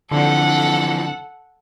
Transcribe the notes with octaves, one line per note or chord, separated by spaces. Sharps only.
D3 E3 F3 C4 A4 F#5